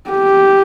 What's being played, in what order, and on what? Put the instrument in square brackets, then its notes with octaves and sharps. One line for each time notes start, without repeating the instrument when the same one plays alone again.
[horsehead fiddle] G4